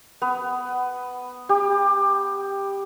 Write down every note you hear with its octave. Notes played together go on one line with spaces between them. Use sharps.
B3
G4